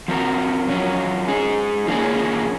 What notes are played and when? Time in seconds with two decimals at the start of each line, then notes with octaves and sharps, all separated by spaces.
0.08 F3 C4 F#4 A#4
0.69 F#3 C#4 F4 A#4
1.28 G#3 D#4 G#4
1.87 F3 A#3 C#4 G#4